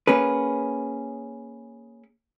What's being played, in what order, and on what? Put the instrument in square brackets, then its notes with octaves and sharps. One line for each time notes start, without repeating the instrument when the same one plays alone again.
[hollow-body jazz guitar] A#3 C#4 G#4 B4